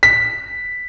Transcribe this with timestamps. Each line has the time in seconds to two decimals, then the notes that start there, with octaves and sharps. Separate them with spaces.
0.03 B6